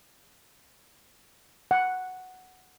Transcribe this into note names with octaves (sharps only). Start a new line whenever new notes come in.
F#5